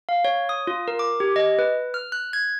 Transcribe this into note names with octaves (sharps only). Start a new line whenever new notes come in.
F5
C#5
D#6
F4
A#4
D6
G4
D#5
B4
F6
F#6
G#6